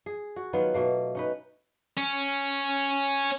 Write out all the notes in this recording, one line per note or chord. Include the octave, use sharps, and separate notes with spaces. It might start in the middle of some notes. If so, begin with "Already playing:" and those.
G#4
F#4
D#3 F#3 B3 F4
B2 A3 A#3
C#4 D#4 B4
C#4